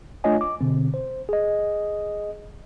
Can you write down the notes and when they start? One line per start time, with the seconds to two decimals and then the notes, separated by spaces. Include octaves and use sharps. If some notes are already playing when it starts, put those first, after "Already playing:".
0.24 A3 D4 F4 C#5 D#5 G#5
0.41 D6
0.61 B2 D3 C4
0.94 C5
1.29 G#4 D#5